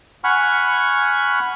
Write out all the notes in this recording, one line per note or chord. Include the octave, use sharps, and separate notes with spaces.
F#5 G#5 B5 C#6 F6